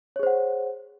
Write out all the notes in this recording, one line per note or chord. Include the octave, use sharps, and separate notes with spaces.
G#4 C5 C#5 F#5